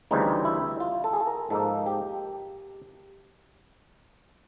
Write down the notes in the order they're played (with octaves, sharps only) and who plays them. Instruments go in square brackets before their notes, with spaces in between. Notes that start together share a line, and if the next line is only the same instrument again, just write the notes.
[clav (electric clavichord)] D2 C#3 E3 G3 C4 D#4
E4
F4
A4
G#4
A4
A#4
G#2 F3 A#3 D#4 A4
G4